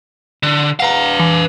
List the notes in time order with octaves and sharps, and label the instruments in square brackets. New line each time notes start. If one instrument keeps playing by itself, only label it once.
[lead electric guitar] D3
[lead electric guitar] B4 F5 [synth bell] F#5 A#5
[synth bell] E3